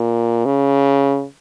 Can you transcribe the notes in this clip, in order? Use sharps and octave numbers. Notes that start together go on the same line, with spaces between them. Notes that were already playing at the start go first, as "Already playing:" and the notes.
Already playing: A#2
C#3